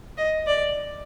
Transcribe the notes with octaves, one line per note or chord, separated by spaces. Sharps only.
D#5
D5